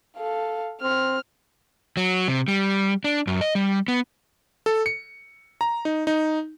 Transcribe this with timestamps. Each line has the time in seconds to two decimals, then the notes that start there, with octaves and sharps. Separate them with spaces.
0.18 A4 F5
0.82 C4 F6
1.97 F#3
2.28 C3
2.48 G3
3.04 D4
3.27 F#2
3.41 D#5
3.55 G3
3.88 B3
4.66 A4
4.86 C#7
5.61 A#5
5.85 D#4
6.07 D#4